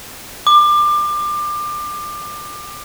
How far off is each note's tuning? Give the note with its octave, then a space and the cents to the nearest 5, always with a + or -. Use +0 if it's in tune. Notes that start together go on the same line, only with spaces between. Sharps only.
D6 +25